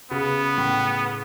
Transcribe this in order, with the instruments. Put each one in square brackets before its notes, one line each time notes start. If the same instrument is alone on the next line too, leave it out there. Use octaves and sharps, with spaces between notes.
[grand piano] C#3 [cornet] B3
[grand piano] A2